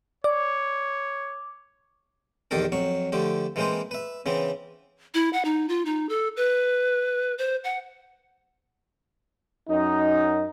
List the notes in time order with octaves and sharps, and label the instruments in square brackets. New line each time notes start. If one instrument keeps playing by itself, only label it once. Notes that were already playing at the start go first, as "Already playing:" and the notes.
[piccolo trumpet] C#5 [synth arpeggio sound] D5 [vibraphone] D6
[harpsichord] A#1 E2 D#3 G4 A4 A#4
F2 F#3 C#6
D3 F3 A3 G4
E3 G#3 A#3 C4 B4 C5
B4 E5
C#3 E3 B3 C4
[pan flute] E4
F#5
D#4
F4
D#4
A4
B4
C5
F#5
[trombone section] F#2 D#4